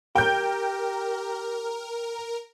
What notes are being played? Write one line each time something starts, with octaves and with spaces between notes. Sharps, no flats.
G4 A#4 G5 G6